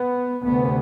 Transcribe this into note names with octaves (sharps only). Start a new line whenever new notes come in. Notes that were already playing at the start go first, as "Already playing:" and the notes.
Already playing: B3
D2 C3 B3